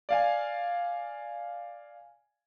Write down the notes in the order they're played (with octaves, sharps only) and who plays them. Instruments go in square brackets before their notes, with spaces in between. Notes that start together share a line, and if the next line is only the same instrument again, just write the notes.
[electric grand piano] D5 F5 G#5